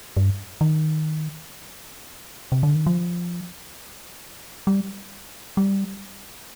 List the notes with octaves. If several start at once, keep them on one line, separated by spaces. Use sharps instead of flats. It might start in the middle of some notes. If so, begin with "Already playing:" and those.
G2
D#3
C3
D3
D#3
F3
G3
G3